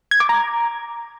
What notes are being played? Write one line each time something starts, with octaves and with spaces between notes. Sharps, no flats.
G#6
D6
A#5